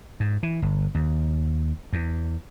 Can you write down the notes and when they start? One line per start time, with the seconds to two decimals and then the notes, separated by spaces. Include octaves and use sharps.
0.20 G#2
0.43 E3
0.62 G1
0.95 D#2
1.93 E2